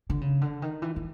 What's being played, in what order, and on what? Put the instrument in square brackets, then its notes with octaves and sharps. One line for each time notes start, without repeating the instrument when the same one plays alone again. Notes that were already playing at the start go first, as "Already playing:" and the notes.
[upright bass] D3
C#3
D3
D#3
E3
E3